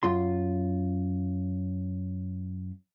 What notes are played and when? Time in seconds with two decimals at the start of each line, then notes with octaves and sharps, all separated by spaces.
0.03 F#2 F4 C6